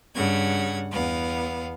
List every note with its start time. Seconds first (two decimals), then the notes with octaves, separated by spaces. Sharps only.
0.14 G2 C#3 F#5 G#6
0.90 E2 B3 F5